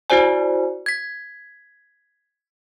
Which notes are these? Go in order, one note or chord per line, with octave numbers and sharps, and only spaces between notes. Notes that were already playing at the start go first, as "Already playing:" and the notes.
E4 F#4 C5 D5 G#5
G#6 B6